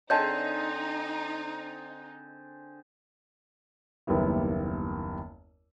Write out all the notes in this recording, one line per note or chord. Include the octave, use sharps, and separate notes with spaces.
D3 C4 D#4 G#4 C#5 D#5 A5 G6
F#1 D#2 G3 B3 E4